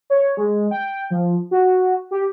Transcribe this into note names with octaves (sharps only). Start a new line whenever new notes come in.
C#5
G#3
G5
F3
F#4
G4